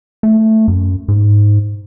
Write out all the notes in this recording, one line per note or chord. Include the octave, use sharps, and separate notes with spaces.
A3
F#2
G#2